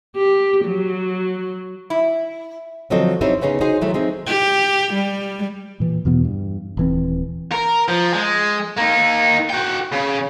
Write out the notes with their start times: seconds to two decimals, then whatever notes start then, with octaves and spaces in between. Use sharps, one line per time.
0.16 G4
0.65 F#3
1.90 E4
2.90 D3 F3 F#3 C4 A4 D#5
3.21 C4 C#4 D#4 E4 G4 C5
3.41 C#3 B3 C#4 D#4 G#4
3.61 D#4 F#4 G#4 C5
3.81 D#3 F#3 A3 E4
3.94 C4 D#4 G#4
4.27 G4
4.94 G3
5.80 A#2 E3
6.05 E2 B2 E3 B3
6.25 G2
6.77 D#1 E3 C4
7.52 A#4
7.88 F3
8.13 G#3
8.77 A#3 D#4
9.50 F#4 G5
9.93 C#3